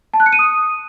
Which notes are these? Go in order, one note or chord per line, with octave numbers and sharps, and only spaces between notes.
A5
F#6
C#7
D#7
D#6